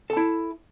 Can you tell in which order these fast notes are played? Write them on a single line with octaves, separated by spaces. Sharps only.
A4 A5 E4